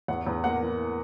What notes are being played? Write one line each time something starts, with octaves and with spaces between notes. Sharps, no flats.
E2 F#5
E2
A#3 F#5
E3